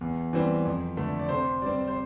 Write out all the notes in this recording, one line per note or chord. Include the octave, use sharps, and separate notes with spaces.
E2
E3 G3 C4
F2
D3 A3
D5
C3 C5
G3 C4 D5
C5